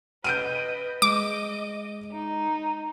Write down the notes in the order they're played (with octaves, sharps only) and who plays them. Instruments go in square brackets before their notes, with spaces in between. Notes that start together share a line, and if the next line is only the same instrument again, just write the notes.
[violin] B4 D#5 [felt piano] G6 D7 D#7
[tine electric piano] G#3 [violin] D#5 [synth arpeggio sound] D6
[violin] D#4